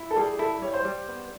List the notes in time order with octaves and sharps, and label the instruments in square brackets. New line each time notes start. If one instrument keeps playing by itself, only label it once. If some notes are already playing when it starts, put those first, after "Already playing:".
Already playing: [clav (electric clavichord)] E4
[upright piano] A4
[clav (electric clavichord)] G3 [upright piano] G#4
[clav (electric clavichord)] E4 [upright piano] A4
[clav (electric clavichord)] G3 [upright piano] C#5
[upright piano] C5
[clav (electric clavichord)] G3
B3